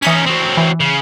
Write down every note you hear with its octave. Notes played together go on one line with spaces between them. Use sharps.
E3 C#4 D#4 D#6 B6
F#3 C4
E3
C#3